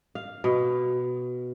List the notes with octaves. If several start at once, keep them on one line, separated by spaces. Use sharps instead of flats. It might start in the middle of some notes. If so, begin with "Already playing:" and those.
F5
B2